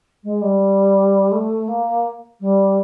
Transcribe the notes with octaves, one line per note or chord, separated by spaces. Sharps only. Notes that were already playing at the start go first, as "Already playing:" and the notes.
G#3
G3
A3
A#3
G3